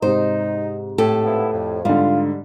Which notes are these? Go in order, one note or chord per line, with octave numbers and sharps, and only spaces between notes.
G#2 C3 D#4 C5
A2 G4 A4
F3 B3 E4
F2
G#2 D3 G3 F4